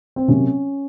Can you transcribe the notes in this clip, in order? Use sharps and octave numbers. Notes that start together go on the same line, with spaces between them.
C4
C3 F#3 A#3 C#4